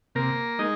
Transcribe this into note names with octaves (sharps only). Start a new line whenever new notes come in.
C3 A#3 A#4
G#3 D#4 D#5